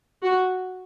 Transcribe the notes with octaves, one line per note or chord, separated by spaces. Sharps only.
F#4